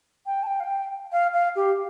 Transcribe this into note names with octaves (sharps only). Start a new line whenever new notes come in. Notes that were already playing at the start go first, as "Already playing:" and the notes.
G5
A5
G5
F5
G5
F5
F5
G4